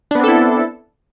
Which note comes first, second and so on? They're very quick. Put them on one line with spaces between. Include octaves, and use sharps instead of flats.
D4 B3 C4 A4 E4